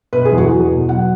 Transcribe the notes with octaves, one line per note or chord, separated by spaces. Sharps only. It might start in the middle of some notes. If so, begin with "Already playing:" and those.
B2 B4
G#4
E2
F#4
E2
B2
F#3 F#5